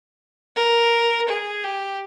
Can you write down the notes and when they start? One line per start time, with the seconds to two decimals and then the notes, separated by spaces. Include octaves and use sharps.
0.56 A#4
1.28 G#4
1.63 G4